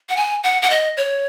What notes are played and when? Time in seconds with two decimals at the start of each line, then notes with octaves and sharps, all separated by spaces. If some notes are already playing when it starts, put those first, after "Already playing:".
0.09 F#5
0.17 G#5
0.44 F#5
0.62 F#5
0.70 D#5
0.97 C#5